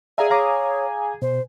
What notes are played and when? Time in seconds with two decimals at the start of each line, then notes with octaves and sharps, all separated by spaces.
0.18 G#4 D5 E5 F5 G#5 A#5
0.30 C#5 F5 A#5 D6
1.22 B2 C5